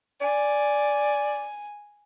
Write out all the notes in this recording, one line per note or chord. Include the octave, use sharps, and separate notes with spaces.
D5 G#5